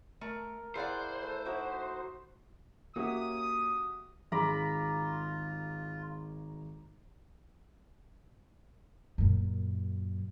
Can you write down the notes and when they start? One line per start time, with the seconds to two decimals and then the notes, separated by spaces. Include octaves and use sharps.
0.21 A3 A#4
0.75 E4 G#4 C5 D5 F5 F#5
1.23 A3
1.45 D#4 F#4 E5 D6
2.96 A#3 C#4 F#4 G4 E5 D#6
4.32 G#1 F4 G#4 A#5 B5 D6
9.18 F#2 A#2